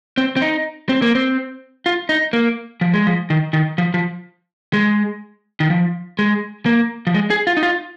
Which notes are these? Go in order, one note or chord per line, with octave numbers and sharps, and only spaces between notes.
C4
C4
D#4
C4
A#3
C4
F4
D#4
A#3
F3
G#3
F3
D#3
D#3
F3
F3
G#3
D#3
F3
G#3
A#3
F3
G#3
G#4
F4
D#4
F4